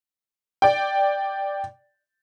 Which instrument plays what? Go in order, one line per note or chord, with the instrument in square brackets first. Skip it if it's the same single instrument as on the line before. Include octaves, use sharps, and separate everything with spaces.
[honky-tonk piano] D5 G5